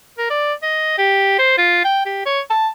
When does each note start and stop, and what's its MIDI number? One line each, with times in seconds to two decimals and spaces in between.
0.18 0.28 70
0.30 0.53 74
0.63 0.96 75
0.98 1.34 67
1.39 1.57 72
1.58 1.82 65
1.85 2.03 79
2.06 2.25 67
2.26 2.41 73
2.50 2.68 81